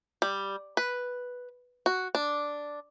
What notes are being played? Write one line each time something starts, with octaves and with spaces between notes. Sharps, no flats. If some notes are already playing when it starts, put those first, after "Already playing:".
G3
B4
F#4
D4